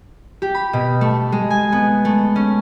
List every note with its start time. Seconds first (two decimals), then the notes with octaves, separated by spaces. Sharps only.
0.42 G4
0.55 B5
0.73 B2
1.01 A3
1.32 G#3
1.50 G#5
1.72 B3
2.05 A3
2.36 C#4